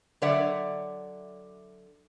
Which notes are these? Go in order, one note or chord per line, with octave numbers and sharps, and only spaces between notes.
D3 F#3 C#5 D5 E5 F#5